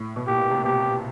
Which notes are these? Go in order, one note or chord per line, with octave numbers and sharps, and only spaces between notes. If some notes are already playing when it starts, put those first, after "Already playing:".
Already playing: A2
B2
A#2 G4
C3
B2 G4